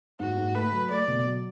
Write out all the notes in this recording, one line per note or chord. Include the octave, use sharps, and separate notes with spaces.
G#2 F#4
G#2
A3 B4
F#3
A3 D5
B2
F#3